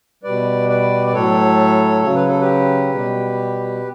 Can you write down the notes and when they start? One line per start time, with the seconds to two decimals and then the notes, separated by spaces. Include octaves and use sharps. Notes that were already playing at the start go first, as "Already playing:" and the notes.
0.24 B2 G3 B4 D5
0.69 B4 D5
1.07 D5
1.13 A2 F#3 A4 C#5
2.02 C#3 F#3 C#5
2.15 B4
2.28 A4
2.40 G4 B4
2.92 B2 G3